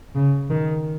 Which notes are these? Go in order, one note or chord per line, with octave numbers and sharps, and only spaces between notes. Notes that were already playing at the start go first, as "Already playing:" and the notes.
C#3
D#3